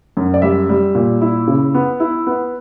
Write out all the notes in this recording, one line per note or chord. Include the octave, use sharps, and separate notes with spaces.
F#2
D5
G3 E5
G3
A#2
E4
C#3
B3
E4
B3